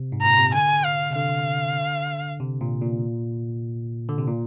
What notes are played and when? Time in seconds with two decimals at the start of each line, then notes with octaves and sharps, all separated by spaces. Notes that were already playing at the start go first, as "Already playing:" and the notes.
Already playing: C3
0.12 G#2
0.22 A#2 A#5
0.39 C3
0.54 D3 G#5
0.85 F5
1.11 C3
1.16 D3 F5
2.40 C3
2.61 A#2
2.82 A#2
4.09 D3
4.18 C3
4.28 A#2